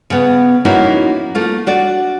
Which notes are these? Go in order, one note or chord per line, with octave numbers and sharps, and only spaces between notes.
C#3 B3
F3 A#3 C#4 D#4 E4 F#4
A3 A#3 F4
D4 F#4 D5